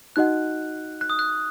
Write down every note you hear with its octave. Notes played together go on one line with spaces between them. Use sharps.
D#4 F#4 D#5 F#5 F#6
F#6
D#6
F#6